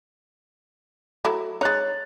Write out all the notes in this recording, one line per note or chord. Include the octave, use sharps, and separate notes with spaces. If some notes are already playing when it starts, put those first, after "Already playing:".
F#3 A3 E4
G#3 D#4 C#5 F#6 A6